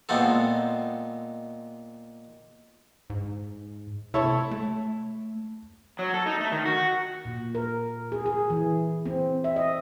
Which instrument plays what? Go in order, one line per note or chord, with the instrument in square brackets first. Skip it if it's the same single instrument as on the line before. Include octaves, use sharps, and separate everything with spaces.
[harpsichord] A#2 G#3 B3 C4 A4
[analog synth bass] G#2
[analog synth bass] C3 [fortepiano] E4 A4 C#5
[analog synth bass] A3
[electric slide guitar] F#3
A4
D#4
A3
D#3
F#4
[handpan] A#2
A#4
G#4
G#4
E3
C4
E5
D#5